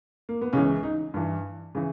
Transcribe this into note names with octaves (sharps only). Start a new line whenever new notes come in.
A#3
B3
C#2 C#3 E3 C#4
D#4
G2 E3
C#3 E3